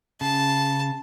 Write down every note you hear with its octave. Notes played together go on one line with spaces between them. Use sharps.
C#3 A5